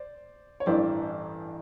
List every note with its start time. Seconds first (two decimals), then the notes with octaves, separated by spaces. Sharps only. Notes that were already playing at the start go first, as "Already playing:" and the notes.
Already playing: C5 D5
0.60 C#5
0.66 A1 G2 E3 C5 D5